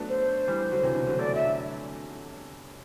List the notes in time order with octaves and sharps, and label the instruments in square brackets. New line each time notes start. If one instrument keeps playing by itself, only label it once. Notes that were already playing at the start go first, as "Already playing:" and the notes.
Already playing: [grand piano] F#3 A3 B3 D4
[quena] C5
[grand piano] E3 G3
D3 F#3
C3 E3
B2 D3
D3 F#3
[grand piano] F#3 A3 [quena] D5
[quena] E5